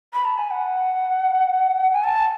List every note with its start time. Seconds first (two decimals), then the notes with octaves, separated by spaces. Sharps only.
0.13 B5
0.25 A5
0.37 G#5
0.50 F#5
1.92 G#5
2.03 A5